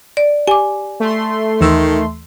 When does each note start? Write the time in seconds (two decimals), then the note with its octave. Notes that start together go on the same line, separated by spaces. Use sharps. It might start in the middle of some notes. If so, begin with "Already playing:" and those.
0.17 D5
0.47 G4 G#5 D6
1.00 A3 C6
1.61 D#2 D#3 E3 E6